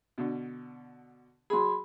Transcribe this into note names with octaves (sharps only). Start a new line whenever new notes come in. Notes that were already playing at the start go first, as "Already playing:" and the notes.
B2 D3
F#3 G#4 B5 C6